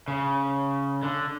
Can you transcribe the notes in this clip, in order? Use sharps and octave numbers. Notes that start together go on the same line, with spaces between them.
C#3
D3